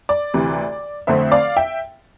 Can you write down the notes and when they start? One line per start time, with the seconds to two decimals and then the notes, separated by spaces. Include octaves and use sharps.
0.09 D5
0.34 D2 C3 E3
1.07 F2 D3 A3 C4 C5 E5
1.32 D5 F5
1.56 E5 G5